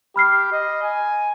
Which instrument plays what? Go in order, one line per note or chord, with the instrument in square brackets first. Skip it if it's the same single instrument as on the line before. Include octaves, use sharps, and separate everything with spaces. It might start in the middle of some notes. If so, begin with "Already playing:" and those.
[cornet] G4 [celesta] B5 F6 C7
[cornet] D#5
G#5